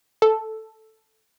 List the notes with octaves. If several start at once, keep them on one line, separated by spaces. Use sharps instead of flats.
A4